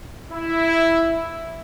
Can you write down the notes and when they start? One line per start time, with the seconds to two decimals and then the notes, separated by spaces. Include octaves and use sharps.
0.31 E4